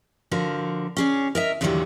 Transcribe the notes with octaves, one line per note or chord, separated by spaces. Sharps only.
D3 F3 F#4 A#4
C#4 G#4 D5
A#4 D#5 E5
E2 A#2 D3 D#3 F#3 G3